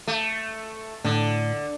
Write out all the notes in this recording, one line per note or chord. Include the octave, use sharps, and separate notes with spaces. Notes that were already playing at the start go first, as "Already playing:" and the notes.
A3
A2 D3